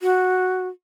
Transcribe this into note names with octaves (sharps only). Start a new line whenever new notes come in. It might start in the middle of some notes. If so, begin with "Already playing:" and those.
F#4